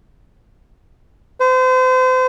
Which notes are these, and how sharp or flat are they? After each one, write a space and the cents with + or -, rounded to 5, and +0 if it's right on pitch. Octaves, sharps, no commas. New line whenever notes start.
C5 -35